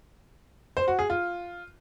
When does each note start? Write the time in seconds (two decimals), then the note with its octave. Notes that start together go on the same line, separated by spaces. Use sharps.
0.77 C5
0.88 F#4
0.99 G#4
1.10 F4